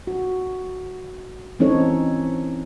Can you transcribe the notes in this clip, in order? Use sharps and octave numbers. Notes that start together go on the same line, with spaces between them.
F#4
E3 C4 C#4 D#4 A4 C#5